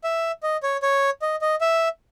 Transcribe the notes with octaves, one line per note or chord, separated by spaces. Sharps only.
E5
D#5
C#5
C#5
D#5
D#5
E5